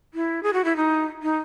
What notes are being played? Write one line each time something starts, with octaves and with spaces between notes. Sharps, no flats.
E4
G#4
F#4
E4
D#4
D#4